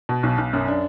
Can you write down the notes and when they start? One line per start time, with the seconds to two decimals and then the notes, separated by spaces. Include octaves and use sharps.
0.09 B2
0.23 B1
0.38 B1
0.53 F#2
0.68 D4